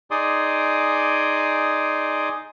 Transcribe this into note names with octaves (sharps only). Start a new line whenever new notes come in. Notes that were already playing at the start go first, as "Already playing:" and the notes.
D#4 G#4 D5 C6 D6 D#6